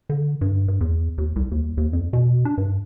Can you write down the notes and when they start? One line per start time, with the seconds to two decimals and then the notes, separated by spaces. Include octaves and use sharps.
0.09 D3
0.41 G2
0.68 G2
0.81 E2
1.18 D#2
1.36 C2
1.51 D#2
1.77 D#2
1.93 F2
2.13 B2
2.45 D4
2.58 G2